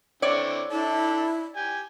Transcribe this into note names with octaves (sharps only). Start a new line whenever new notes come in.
D3 C4 E4 C#5 D5
D4 E4 A4
G4 G#5